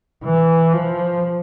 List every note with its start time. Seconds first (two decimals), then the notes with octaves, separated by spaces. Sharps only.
0.24 E3
0.73 F3